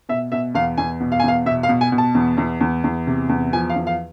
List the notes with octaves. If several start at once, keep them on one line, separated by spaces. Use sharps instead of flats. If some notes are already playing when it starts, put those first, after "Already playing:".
B2 E5
B2 E5
E2 F5
E2 G#5
B2
F5
G#5
E2 F5
B2 E5
F5
B2
G#5
B2
A5
E2
E2
E2
E2
C3
E2
F3 G#5
F5
E2
F5